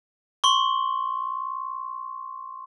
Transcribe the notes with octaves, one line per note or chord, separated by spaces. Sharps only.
C6 C#6